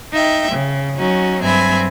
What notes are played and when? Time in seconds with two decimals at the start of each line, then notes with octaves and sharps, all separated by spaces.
0.12 D#4 E5 G5
0.52 C#3
0.96 F#3 C#4 D#4 F#4
1.42 G2 F#3 C4 E5 G#5 B5